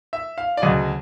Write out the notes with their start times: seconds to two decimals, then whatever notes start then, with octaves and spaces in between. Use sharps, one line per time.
0.13 E5
0.38 F5
0.57 D5
0.62 D2 C#3 F#3 D#5